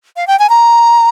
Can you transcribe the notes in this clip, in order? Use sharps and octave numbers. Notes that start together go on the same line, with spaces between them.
F5
G5
G#5
A#5